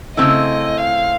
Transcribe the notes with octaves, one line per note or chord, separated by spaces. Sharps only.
C#3 F3 A3 C4 E4 D#5
F5